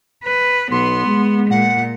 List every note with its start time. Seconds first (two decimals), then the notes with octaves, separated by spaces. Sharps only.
0.24 B4
0.71 B1 B3 C6
1.06 G#3
1.50 A#2 F#5